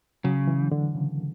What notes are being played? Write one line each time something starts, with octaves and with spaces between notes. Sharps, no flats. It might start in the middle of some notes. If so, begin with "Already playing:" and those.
C#3 F#3
E3
D3
C#3